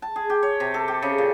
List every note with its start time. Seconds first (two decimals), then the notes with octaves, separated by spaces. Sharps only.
0.02 A5
0.16 G#4
0.30 G4
0.43 C#5
0.60 C3
0.74 A4
0.88 G4
1.02 C#3
1.18 A#2